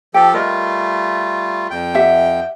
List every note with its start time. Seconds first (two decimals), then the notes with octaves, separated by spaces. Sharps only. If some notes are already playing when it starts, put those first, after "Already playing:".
0.14 F3 G4 A4 G5
0.34 G3 A3 F4 A#4 D#5
1.71 F2 G5
1.94 G4 E5 F#5